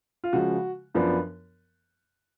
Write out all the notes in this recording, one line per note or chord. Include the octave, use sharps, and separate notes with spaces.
F4
C#3 F3 G#3 F#4
F#2 F3 B3 D4